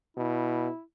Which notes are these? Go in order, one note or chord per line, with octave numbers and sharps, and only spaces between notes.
B2 E4